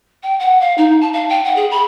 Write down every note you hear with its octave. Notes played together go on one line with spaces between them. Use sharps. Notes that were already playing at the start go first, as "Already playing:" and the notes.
G5
F#5
F5
D#4
A5
F5
G5
F#5
G#4
B5